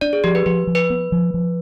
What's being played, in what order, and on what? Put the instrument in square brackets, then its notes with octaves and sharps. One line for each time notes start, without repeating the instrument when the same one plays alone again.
[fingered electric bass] D4 [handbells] D5
[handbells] G#4
[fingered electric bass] F3 [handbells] G4
[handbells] B4
[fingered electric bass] F3 [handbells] B4
[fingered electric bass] F3
[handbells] B4
[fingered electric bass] B3
F3
F3